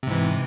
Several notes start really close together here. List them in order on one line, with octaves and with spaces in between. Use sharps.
C3 G#2 E3